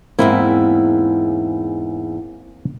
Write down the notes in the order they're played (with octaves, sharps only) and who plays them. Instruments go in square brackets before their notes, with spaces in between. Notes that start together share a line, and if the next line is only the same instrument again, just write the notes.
[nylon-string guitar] E2 G#2 E4 [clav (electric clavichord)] A#3 C4 A#4